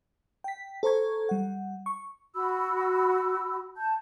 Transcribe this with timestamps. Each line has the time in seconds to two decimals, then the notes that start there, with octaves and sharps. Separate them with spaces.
0.44 G5 B6
0.83 A4 C5 A#5 C#6 G#6
1.29 G3 F#5
1.86 C#6
2.34 F#4 B5 E6
3.77 A5 G6